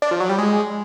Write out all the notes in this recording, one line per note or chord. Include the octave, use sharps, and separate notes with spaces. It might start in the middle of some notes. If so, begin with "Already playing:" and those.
D4
F3
F#3
G3
G#3